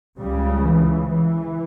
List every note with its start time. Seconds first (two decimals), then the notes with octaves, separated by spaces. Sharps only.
0.19 C#2 C#3 G3
0.64 E3
1.09 E3